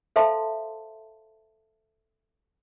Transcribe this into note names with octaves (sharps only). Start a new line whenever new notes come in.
A4 C5 E5 F5 A5 C6